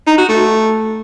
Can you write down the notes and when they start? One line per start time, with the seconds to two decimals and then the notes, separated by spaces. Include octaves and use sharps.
0.07 D#4
0.18 F#4
0.29 A3